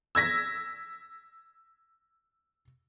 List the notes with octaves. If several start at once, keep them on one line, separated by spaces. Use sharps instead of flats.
E6 G#6 A#6 B6